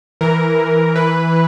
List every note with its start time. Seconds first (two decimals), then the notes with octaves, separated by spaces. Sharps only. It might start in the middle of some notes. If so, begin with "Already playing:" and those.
0.21 E3 A#4
0.58 E3
0.96 E3 B4
1.33 E3